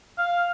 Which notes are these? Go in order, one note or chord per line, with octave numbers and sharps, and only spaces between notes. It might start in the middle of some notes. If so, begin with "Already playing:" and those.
F5